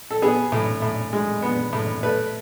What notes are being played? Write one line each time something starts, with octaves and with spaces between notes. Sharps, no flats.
A4
B3 G#4
A2
A2
G#3
B3
A2
A3 B4